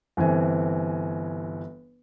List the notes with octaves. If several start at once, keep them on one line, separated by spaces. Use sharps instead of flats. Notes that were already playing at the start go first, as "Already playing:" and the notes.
G1 E3 C4 G#5